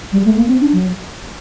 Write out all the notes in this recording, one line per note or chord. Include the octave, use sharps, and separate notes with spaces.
G3
A3
A#3
C4
D4
F#3